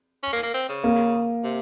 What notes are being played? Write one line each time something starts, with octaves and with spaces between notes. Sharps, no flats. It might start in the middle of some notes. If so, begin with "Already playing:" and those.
C#4
A#3
A#3
C4
C#3
A#3
C3